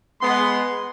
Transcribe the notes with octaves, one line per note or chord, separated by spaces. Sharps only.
G#3 B3 C6